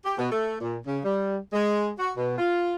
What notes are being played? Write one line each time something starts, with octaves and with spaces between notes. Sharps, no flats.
G4
B2
A3
A#2
C#3
G3
G#3
F#4
B2
F4